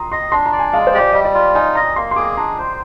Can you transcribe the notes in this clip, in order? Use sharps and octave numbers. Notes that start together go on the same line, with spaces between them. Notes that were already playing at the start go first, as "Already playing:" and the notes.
Already playing: A#5 C6 D#6
D#5 C6
D4 C6
A#5
D5
G#5
G#3 F5
C5
G4
D5
G3 D#5
D5
F4
D#4 G#5
D#5 A#5
A#3 C6
C6
G#4 D6
D4 A#5
C5